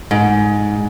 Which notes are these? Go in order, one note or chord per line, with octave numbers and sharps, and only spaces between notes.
G#2